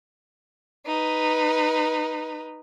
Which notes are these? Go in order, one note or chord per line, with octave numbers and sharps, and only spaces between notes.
D#4 B4